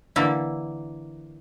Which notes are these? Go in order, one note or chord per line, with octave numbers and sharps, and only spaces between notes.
D3 E3 A#3 E4